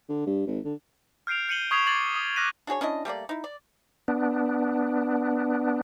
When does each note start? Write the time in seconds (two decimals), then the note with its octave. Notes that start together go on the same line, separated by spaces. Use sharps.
0.09 D3
0.26 G2
0.47 G#1
0.64 D3
1.27 F6 G6 C7 D7 F7
1.49 G6 C#7 D#7 F#7 G7
1.71 C#6 D#6 G#6 B6 C7 F7
1.87 D6 G#6 A6 C7 F#7
2.15 D#6
2.36 D6 F6 F#6 A#6 B6 D#7
2.67 D4 F#4 G#4 C#5
2.81 C#4 D4 E4 D#5
3.05 G3 A3 A#3 D5
3.29 D#4 E4
3.44 D5
4.08 B3 D4